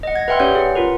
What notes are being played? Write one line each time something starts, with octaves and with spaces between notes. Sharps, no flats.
D#5 F#5
G#6 A#6
B4 E5 F#5 G5 C6 F6
C#4 G4 C#5 D5 F6 G6
G#4 F#5
F4 A#4 B4